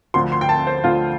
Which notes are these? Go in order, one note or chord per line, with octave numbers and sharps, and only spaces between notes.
D2 D3 F3 C6
C6
G5
A5
C5
D2 D3 F3 F4